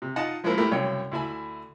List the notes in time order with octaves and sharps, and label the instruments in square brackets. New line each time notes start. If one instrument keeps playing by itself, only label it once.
[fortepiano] C3
D#4 F4 D#5 F#5 A5
F3 G#3 A#3 C4 E4 A#4
A3 B3 E4 G4 A#4
C2 F#2 C#3 C#5 G5
D2 E4 E5 G#5 B5